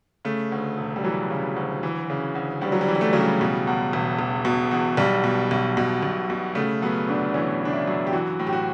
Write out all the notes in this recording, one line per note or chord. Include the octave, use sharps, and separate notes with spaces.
C#3 A3
D2
E1
G3
E3 F#3
C#3
D2
E3
C#3
D2
D2 G3
F#3
G3
E3
G3
A3
C#3 F#3
G3
B2
E2
E1
E1
B2
E2
B1 G3
B2
B1
B2
B1
B2
C#3 A3
F#2 B3
G1 D4
E3 C#4
C#3 D4
E4
F#2
G4
E3 F#4
A2
G4
F#4